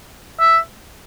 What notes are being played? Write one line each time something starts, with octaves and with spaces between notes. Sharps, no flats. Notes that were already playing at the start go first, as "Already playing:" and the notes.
E5